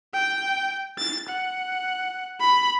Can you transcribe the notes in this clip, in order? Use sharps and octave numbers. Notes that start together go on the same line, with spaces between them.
G5
A6
F#5
B5